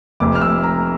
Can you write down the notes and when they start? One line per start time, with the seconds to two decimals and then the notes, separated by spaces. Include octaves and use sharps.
0.20 F1 F2 C3 D6
0.35 F6
0.41 E6
0.63 A#5